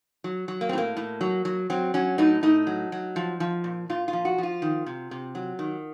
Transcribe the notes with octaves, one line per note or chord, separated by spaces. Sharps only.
F#3
F#3
A#3
C4
A2 A#3
A2
F#3
F#3
F#3 C4
F#3 C#4
A2 D#4
A2 D#4
F#3
F#3
F3
F3
A#2
A#2 F4
F4
F3
F#4
F3 F4
D#3
C3
C3
F#3
D#3